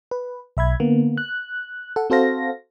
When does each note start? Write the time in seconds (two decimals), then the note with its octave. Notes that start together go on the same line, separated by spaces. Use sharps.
0.11 B4
0.57 B1 E5 B5 G#6
0.80 D3 A#3 B3
1.17 F#6
1.96 A4 F#5
2.10 C4 F#4 A4 C5 F5 A#6